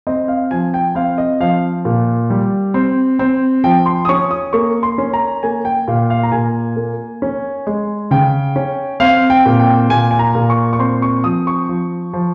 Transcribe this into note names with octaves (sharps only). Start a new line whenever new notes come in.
C4 D#5
F5
F3 G#5
G5
C4 F5
D#5
F3 F5
A#2
G3
C4
C4
F3 G5
C6
D#6
C#4 C#6
D#6
A#3 C#6
C6
C#4
A#5
A#3 G#5
G5
A#2 F5
F5
A#5
A#2 G#5
A#3
C#4
G#3
C#3 G5
C#4
C4 F5
G5
A#2
G5
A#2 G#5
G#5
A#5
A#2
C#6
C#6
C4 C6
C#6
F3 D#6
C#6
F3
F3